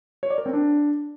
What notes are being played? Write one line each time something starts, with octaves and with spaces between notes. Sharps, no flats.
C#5
D5
A#4
C4
D4